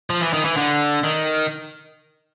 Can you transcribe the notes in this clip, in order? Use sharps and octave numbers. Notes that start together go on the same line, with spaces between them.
F3
E3
D#3
E3
D3
D#3